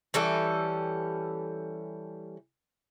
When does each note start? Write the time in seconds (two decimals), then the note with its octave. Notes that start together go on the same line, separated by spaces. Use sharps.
0.14 E3 G3 C#4 A4